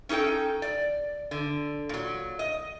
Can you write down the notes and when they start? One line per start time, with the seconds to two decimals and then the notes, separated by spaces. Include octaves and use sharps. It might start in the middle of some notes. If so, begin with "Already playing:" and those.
0.09 C#4 D#4 G#4 A4 G5
0.62 D5
1.31 D3
1.89 A#2 F#3
2.39 D#5